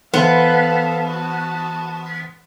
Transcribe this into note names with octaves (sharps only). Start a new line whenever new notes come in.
E3 B3 A4 C5 F5
F#4 A5